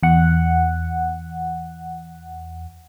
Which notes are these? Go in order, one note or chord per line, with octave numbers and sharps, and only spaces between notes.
E2 F#5